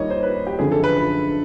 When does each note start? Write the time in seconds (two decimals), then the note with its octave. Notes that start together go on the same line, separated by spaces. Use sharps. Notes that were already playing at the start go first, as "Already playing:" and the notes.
Already playing: D#2 D#3 G3 A#3 C#5 D#5
0.10 C5
0.23 B4
0.47 G4
0.59 F#2 D3 F3 G#4
0.72 A4
0.84 B4